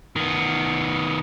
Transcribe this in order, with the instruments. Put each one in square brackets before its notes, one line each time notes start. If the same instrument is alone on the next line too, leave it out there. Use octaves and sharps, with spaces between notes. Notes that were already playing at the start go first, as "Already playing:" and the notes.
[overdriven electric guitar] D#3 B3